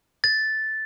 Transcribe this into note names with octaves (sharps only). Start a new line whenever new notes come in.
A6